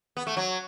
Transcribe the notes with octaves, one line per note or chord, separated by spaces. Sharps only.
B3
A3
F#3